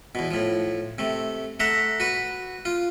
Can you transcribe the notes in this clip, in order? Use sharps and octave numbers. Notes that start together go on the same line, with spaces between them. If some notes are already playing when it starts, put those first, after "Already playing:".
E2 B2
A2 F3
C3 A3
A3 E5 F#5 A#5
F#4 B4
F4